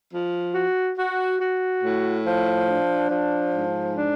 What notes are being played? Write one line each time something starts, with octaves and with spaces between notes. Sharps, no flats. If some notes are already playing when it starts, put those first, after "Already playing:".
F3
F#4
F#4
F#4
A2
F3
D4
F3
G#2
D4